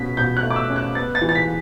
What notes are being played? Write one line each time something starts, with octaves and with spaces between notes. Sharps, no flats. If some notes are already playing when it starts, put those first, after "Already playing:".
Already playing: B2 C#4 B6
B2 G6
F#6
A3
D6
E6
C#4
F#6
B3 A6
A6
E3
A6
B6